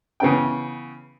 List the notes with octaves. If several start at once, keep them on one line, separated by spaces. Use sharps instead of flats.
C#3 E3 B3 C#4 G5